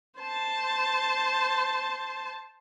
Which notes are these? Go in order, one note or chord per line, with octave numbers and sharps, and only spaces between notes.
C5 A5